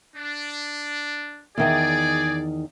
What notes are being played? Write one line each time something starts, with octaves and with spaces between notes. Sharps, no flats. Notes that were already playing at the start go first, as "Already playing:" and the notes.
D4
E2 D#3 G#4 D5 D#5